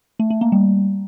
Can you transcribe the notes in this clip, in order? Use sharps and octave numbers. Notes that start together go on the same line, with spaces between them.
A3
A3
A#3
G3